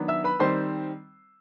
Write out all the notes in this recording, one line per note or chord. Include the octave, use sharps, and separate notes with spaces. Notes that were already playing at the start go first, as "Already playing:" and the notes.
Already playing: D#3 F#3 B3 D4
E5 E6
B4 B5
D#3 G3 C4 C5 C6